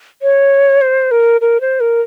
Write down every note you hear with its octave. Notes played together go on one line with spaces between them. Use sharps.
C#5
C5
A#4
A#4
C5
A#4